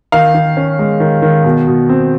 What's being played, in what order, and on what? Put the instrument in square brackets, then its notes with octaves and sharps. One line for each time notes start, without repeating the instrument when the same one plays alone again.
[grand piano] D#3 F5
D#3
C#4
G#3
D#3
D#3
B2
B2
C4